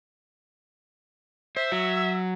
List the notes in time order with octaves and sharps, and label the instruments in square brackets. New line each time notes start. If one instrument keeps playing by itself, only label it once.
[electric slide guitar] C5 [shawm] E5
[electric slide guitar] F#3